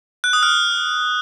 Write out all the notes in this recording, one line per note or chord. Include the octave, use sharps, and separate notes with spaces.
F#6
D#6
F6